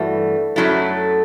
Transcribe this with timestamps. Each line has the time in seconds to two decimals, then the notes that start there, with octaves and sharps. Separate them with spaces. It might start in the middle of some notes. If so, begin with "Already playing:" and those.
Already playing: G2 E3 A3 F#4
0.56 F#2 F#3 A3 E4